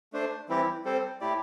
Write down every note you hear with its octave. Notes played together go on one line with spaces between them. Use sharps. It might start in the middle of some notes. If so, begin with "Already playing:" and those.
A3 D4 C5
E3 G3 C4 E4 G4
G3 C4 A4 C5
A2 A3 E4 G4 D5